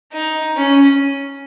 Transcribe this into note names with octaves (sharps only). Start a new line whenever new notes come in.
D#4
C#4